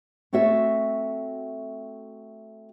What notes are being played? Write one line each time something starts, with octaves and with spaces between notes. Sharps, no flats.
A3 C4 F#4 A4 C#5 E5